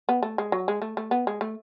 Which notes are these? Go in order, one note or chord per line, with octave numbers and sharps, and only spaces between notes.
B3
A3
G#3
F#3
G#3
A3
A3
B3
G#3
A3